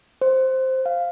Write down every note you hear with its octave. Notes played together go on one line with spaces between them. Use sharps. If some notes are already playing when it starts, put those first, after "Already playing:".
C5
F5